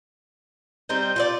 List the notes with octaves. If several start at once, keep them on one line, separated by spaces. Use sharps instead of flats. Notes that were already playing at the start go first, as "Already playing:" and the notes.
G3 C4 D#4 G6
F4 F#4 D5